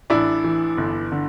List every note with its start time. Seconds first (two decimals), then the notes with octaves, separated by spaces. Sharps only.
0.10 A1 D4 E4
0.44 E3
0.78 G1
1.12 D3